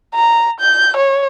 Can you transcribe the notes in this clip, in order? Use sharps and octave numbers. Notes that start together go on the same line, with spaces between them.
A#5
G6
C#5